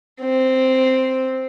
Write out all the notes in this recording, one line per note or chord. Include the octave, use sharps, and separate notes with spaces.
C4